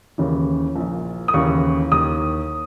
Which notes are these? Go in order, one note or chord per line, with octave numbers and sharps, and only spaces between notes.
D#2 C#3 E3
A#1 A#2
D#6
D#2 C#3 E3 C#6
D#2 D#3 D#6